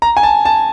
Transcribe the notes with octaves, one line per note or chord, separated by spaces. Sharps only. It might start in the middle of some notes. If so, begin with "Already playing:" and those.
A#5
G#5
A5
A5